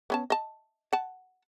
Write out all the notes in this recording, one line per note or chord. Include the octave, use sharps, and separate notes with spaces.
B3 C#4 A5
D#5 A5
F#5 A5